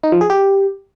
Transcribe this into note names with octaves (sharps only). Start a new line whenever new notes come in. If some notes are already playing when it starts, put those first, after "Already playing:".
D#4
F3
G#4
G4